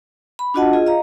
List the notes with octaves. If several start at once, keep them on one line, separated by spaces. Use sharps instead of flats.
B5
D4 F4 F#4 D#5 F#5 A5
F4 G#4 D#5
D#5 F5 A#5